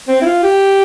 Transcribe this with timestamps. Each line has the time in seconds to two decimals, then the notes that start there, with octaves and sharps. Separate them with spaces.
0.08 C4
0.21 E4
0.25 F4
0.43 G4